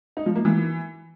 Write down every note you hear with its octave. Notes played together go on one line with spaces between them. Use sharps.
D#4
F3
A#3
E3